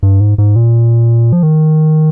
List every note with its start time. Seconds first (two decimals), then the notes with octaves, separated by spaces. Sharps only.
0.03 G2
0.20 G#2
0.38 G#2
0.56 A#2
1.33 F3
1.43 D#3